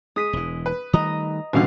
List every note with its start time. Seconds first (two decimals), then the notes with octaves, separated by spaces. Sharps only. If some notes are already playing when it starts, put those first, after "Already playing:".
0.16 G#3 D#6 B6 D#7
0.33 E1 E3
0.66 B4
0.93 D#3 G3 A3 D#5 A#5 D#6
1.53 D#1 G#1 B2 D3 D4 F5